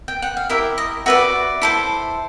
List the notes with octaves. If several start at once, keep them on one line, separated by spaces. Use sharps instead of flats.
G5
F#5
F5
E4 G4 A#4 E5
D#5
F#4 B4 D5 E5
E4 A4 C5